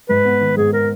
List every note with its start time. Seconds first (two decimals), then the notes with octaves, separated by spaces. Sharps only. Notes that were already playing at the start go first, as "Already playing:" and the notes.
0.09 G#2 B4
0.25 B3
0.41 D#3
0.57 G#2 G#4
0.73 A#4